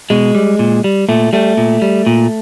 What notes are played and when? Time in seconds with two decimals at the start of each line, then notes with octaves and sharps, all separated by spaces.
0.10 B2 G#3
0.35 G3
0.59 A#2
0.84 G3
1.09 A#2 A3
1.33 G3 A3
1.57 A#2
1.82 G3
2.07 A#2